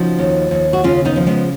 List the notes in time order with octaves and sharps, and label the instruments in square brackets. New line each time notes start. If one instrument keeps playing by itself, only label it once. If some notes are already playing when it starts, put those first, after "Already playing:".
Already playing: [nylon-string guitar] C#3 F3 D#4 F#4
D#2
D#2
F#4
C#3 C#4 F4
B3 D#4
F3
G#3 B3